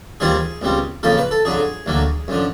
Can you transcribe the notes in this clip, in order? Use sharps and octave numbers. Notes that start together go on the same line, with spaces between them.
D#2 D#3 G3 C4 F4 G#4
C#2 B2 G3 C4
F2 C#3 F3 A#3 A4
B4
A4
F2 D3 F#3 G#4
D2 D3 F#3 A#3
F#2 D3 F3